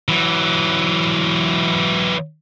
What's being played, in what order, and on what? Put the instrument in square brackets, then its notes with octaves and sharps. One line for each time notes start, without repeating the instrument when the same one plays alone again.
[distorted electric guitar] E3 F#3